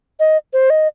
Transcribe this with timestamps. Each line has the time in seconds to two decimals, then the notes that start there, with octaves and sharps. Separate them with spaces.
0.20 D#5
0.53 C5
0.70 D#5